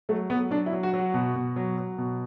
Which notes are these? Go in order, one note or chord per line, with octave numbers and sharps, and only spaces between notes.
F#3 A3
F#3 B3
F#3 D4
E4
F#3
F#4
F#3
F#4
B2
B2
F#3
F#3
B2